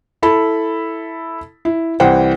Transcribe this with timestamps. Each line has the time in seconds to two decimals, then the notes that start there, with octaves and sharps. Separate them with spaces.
0.23 E4 A4 B5
1.65 E4
2.00 C2 E3 C5 F#5 G5